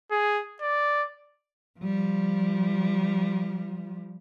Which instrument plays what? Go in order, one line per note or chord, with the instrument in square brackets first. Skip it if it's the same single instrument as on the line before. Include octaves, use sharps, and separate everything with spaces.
[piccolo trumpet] G#4
D5
[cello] F3 G3